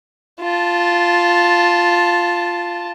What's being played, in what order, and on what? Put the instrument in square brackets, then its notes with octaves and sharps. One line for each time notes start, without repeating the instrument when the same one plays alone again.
[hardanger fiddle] F4 A5